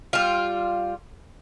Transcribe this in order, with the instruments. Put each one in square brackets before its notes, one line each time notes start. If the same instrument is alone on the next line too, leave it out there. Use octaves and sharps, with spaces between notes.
[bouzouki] G3 F4